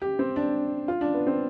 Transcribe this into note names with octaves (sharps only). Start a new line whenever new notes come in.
G4
C4
D4
F4
D4
B3
C4